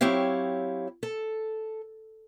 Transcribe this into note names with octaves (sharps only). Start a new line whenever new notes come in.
F#3 C4 E4 G4 C#5 F5
A4